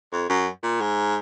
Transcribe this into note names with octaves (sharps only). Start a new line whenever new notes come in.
F2
F#2
A#2
G#2